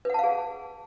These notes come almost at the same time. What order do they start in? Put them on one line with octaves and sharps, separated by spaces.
B4 F#5 A5 F5 G#4